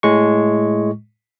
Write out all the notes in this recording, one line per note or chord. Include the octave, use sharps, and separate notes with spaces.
A2 G#3 C#6